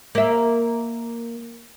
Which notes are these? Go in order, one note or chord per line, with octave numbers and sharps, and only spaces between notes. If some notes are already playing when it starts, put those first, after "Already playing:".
A#3 E5